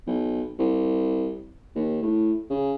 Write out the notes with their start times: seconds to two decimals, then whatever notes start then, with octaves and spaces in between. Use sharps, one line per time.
0.07 B1
0.59 C2
1.75 D#2
2.02 A2
2.50 C#3